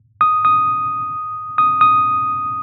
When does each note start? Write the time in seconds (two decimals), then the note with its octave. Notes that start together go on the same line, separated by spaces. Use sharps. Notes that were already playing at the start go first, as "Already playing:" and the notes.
0.21 D#6
0.45 D#6
1.58 D#6
1.81 D#6